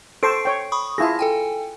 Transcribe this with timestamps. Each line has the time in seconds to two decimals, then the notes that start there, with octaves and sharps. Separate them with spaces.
0.23 A4 C5 C#6 C7 D7
0.45 C#5 G5
0.72 B5 C#6 D#6
0.98 E4 F4 G#4 A5 A#6
1.19 A4 G5 G#5